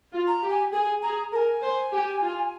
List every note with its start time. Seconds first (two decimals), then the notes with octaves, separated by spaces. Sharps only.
0.13 F4
0.28 A#5
0.43 G4
0.50 G#5
0.72 G#4 G#5
1.02 G#4 A#5
1.32 A#4 A#5
1.36 G#5
1.62 C5
1.92 G4
2.22 F4